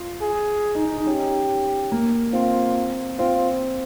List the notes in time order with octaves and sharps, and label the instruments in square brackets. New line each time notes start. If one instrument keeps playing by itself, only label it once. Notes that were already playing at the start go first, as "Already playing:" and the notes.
Already playing: [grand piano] F4
[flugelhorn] G#4
[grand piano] D#4
D#4
D#4
[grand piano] C#4 [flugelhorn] G4
[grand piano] A#3
[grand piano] C4 [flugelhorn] F4
[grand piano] C4 [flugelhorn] F4